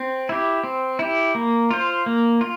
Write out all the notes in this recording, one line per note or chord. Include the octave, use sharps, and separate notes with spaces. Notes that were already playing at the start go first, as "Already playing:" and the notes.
Already playing: C4
E4 G4
C4
E4 G4
A#3
F4 C5
A#3
F4